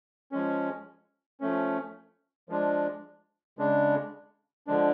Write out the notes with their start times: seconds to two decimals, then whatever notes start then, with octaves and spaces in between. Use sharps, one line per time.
0.32 F3 G#3 C#4
1.40 F3 A3 C#4
2.49 F3 G#3 D4
3.58 C#3 G#3 D4
4.67 D3 F3 G#3 D4